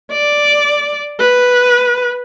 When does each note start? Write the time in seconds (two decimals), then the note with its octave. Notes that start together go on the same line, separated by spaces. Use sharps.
0.12 D5
1.20 B4